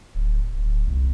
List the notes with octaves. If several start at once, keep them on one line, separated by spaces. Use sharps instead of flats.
D1
D1
C2